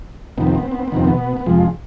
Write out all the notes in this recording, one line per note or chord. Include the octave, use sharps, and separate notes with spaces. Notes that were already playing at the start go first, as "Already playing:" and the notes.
F2 C3 D#3 B3
C4
B3
C4
B3
C4
B3
F2 C3 D#3 C4
B2 B3
B3
F2 C3 F3 G#3